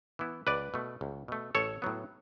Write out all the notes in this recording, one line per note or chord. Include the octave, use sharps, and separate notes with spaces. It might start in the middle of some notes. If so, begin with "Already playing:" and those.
E3 B3 E4
C#2 B4 D5
B2 A3
C#2
B2 A3
A1 A4 C#5
A2 F#3 B3